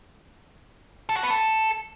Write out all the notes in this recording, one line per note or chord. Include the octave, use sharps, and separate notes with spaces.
A4
F#4
B3
A4